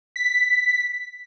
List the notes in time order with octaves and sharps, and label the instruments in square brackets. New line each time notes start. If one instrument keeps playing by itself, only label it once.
[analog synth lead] B6